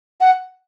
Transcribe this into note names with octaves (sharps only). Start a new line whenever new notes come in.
F#5